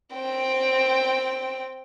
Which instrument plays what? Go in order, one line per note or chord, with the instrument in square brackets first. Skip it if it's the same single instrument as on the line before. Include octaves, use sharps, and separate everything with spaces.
[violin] C4 G5